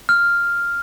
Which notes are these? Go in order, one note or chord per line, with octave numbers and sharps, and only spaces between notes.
F6